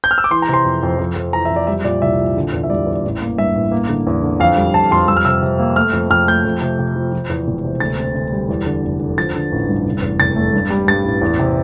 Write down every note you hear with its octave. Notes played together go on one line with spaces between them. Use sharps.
G6
F6
E6
D6
E3 C6
A#5
C3 C6
F2
F2
F2
F2
E3 A#5
E5
F2
D5
G3 E5
A#2 D5
C2 E5
A#2
D3
E2
E5
G3 D5
E2
A1
A#3
G2 E5
A1
A#3
D3
E2
D3
F2 F5
G3
F2 A5
F2 C6
G3 E6
F6
C3 E6
C3
A#3
A3 F6
F2
F2 F6
A3 G6
F2
C3
C3
F3
F3
E2
E1
C3
D2 A6
C4
D2
G3
E2
D3
F1
D3
F3 A6
D3
A1
G2
F1
E2
F1 A6
A3
G2
G3
G2 A6
A1
E2
C3